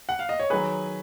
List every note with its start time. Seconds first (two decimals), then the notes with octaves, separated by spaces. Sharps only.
0.09 F#5
0.19 F5
0.29 D#5
0.40 C#5
0.50 D#3 F#3 G#4 B4